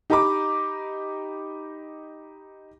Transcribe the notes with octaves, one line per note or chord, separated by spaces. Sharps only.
D#4 G4 D#5 A#5 B5 D6